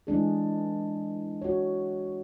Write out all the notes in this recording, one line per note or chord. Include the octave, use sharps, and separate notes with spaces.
E3 G#3 D4 G#4
F#4 C#5